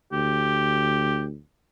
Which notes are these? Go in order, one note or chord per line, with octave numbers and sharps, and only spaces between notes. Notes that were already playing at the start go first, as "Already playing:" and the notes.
D2 G4